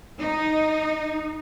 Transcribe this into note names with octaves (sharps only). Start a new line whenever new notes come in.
D#4